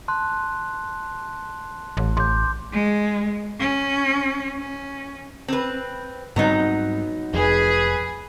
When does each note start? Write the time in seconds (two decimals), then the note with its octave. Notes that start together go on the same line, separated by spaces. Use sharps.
0.08 A5 C6 F#6
1.97 A1
2.17 A1 C6 D6 G6
2.72 G#3
3.60 C#4
4.57 C#4
5.48 C4 B4
6.36 G#2 F#3 G3 B3 C4 D#4
7.34 F1 F2 G#4 B4